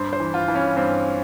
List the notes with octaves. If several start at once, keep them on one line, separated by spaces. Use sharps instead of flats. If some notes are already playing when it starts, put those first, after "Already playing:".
Already playing: G2 C5
C5
E3
F4
E3
C#4
G2 C4